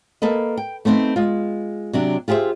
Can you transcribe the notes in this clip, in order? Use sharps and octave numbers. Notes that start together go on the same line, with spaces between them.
A#3 A4 B4 D#5
G5
A3 B3 C4 D4 D#4
G#3 F4
C3 F#3 D4
F4 G4 G#4 C5 E5